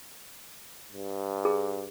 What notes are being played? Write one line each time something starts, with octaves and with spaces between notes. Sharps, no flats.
G2
G#4